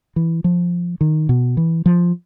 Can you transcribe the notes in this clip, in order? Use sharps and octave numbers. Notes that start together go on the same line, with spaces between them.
E3
F3
D#3
B2
E3
F3